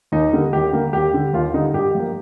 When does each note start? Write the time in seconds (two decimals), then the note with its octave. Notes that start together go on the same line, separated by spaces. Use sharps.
0.12 D#2 D#4
0.33 D3 G3 A#3
0.53 D#2 G4
0.73 D3 G3 A#3
0.93 D#2 G4
1.14 D3 G3
1.33 D#2 F4
1.54 D3 G3 D#4
1.74 G2 G4
1.95 F3 A#3